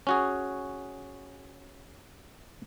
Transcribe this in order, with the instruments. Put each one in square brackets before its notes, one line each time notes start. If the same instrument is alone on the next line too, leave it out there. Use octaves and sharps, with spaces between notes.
[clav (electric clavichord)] C#4 F#4 G#4